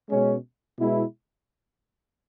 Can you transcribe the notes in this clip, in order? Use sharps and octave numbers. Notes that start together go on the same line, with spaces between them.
B2 G#3 C#4
B2 G#3 B3 E4